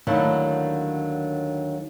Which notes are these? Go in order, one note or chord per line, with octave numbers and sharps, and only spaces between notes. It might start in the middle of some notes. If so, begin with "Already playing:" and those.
D#2 D3 D#3 F#3 A3 E4